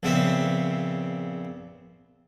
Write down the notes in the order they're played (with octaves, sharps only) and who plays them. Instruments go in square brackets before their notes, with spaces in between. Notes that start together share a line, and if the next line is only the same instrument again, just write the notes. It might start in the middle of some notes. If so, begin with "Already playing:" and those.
[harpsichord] A#1 C#3 B3 C4 E5